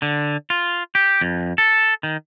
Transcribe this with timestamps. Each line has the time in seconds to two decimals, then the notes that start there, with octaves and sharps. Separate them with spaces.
0.02 D3
0.50 F4
0.95 G4
1.21 F2
1.58 A4
2.03 D#3